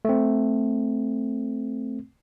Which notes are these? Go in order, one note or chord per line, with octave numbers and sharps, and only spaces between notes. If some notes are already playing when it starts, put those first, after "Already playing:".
A3 C4